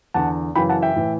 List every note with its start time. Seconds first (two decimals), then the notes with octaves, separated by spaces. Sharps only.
0.14 E2 D3 F#5 A5
0.56 F#2 C#3 E3 G5 B5
0.69 F#5 A5
0.82 E5 G5
0.96 A2 E3